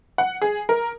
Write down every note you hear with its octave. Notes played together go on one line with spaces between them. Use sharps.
F#5
G#4
A#4